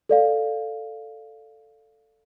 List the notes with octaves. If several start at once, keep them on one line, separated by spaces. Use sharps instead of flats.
A4 D5 F5